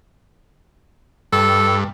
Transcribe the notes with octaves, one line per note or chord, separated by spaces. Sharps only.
G2 A4